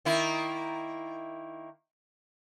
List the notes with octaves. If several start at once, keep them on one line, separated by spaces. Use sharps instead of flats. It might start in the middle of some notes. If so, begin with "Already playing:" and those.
D#3 A#3 E4